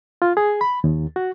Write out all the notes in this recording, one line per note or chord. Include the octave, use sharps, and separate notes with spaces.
F4
G#4
B5
D#2
F#4